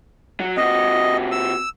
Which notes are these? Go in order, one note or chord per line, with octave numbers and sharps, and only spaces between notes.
F#3
C3 F#4 D#5
E6